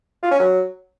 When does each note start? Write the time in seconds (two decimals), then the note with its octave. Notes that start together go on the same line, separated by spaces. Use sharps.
0.23 F4
0.31 C#4
0.40 F#3